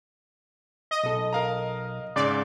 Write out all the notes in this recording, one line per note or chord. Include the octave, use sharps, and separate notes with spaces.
D#5
B1 A4
A#4 F5 A#5
G#2 C#3 G#3 D5